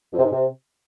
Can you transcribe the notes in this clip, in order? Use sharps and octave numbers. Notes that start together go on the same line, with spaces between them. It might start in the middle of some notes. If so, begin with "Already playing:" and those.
F2
C3
G#2
C3